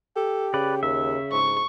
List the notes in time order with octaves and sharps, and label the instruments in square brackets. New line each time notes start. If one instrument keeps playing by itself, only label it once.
[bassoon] G4 [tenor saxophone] A4
[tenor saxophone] C#3 [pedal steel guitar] B4 D5
[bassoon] D#2 [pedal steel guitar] E5
[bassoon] G#2 [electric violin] C#6